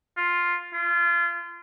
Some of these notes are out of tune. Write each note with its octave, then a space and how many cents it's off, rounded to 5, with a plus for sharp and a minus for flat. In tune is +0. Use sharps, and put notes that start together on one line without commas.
F4 +5
F4 -30